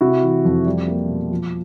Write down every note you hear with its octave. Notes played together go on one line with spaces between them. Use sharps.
C3 E4 F#4
E3
F2
G3
A#3
B2
F3